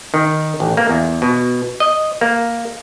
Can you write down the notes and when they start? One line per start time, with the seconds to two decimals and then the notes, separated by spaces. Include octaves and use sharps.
0.14 D#3
0.60 A1
0.77 A#3
0.89 E2
1.22 B2
1.80 D#5
2.21 A#3